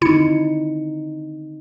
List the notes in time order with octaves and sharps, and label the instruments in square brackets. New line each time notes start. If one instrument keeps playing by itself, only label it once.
[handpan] D3 C4 D#4 [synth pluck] E4 C#7